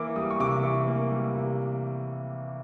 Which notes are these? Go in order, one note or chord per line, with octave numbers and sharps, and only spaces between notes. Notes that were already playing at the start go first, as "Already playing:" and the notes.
Already playing: E3 A#3 D6
G3 D#6
C#6
C3 D6
E3 C#6
A#3
G3
C3